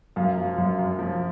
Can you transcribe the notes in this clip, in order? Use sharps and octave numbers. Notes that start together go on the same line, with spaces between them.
F#2 F5
F3
F#2
F#2
F3